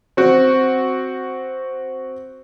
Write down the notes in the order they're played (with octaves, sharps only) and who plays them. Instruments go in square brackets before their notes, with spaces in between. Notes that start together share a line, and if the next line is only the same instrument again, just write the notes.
[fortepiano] C4 F#4